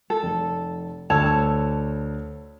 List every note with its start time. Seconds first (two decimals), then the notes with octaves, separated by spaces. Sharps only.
0.10 A4
0.23 F1
1.10 D2 C#5 A5 E6